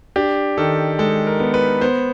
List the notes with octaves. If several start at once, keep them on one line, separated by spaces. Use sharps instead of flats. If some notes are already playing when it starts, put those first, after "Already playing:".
D4 G4
D#3 A4
G#3 A4
A#4
B3
B4
B3 C5